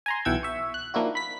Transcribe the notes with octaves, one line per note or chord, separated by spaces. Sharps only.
G#5 A#5 C6
B1 E3 F#5 G5 E6 G#6
E5 C#6
F#6
D#3 F3 A#3 D4 E4 F#4
B5 B6